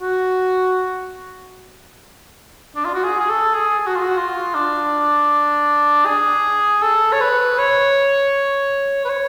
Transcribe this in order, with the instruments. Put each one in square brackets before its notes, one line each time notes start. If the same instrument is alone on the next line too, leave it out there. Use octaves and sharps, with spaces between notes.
[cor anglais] F#4
D4
F4
F#4
G#4
G#4
A4
G#4
G#4
F#4
F4
F#4
F4
D4
G#4
A4
C#5
B4
C#5
B4
C#5